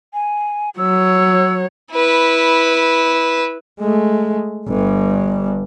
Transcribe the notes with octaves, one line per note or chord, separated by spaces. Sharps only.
G#5
F#3 C#5 E6
E4 B4
G#3 A3
G1 G2